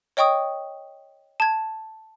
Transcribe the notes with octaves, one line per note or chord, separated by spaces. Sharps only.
C#5 D#5 G5 C#6 D#6
A5 G#6